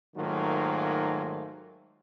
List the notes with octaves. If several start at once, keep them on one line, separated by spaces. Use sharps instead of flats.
G#2 D#3 F#3 A3 A#3 F4